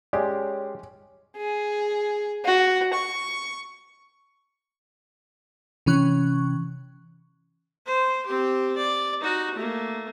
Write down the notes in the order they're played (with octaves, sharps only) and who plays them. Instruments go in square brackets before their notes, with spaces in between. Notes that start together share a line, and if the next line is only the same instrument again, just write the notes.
[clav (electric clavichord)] G#3 G4 [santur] C#4 C6 [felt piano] D5
[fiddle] G#4
F#4
C#6
[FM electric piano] C3 E3 C#4 C#6 F#6
[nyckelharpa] C5
C4 G4
D5
D#4 F#4
A3 A#3